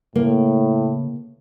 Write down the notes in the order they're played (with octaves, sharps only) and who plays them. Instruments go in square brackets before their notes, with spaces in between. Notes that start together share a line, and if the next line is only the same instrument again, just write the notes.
[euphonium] A2 [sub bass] C#3 [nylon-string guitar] A#3